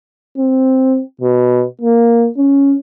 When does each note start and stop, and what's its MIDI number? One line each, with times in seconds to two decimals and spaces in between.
0.38 1.01 60
1.21 1.64 47
1.81 2.27 58
2.37 2.75 61